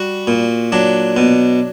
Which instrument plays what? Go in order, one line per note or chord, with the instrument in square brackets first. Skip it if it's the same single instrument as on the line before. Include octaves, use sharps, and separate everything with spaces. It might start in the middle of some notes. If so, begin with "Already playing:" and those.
Already playing: [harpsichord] G3 F#4
A#2
F#3 D4
B2